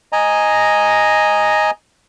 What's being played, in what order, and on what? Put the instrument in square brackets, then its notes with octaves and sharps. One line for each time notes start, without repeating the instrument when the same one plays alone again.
[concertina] D#5 G#5 A#5